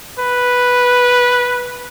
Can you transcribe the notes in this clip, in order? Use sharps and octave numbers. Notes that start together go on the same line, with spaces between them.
B4